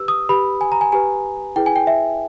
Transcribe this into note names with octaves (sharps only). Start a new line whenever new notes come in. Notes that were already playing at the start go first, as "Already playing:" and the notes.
Already playing: G4 B4 E6
D#6
G4 B4 B5
G#5
A#5
G#5
G4 B4 G#5
E4 G#4 B4 G5
G#5
G5
E5